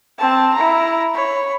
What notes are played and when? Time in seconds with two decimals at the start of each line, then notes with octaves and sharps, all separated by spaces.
0.18 C4 A5
0.54 E4 A#5
1.14 C#5 B5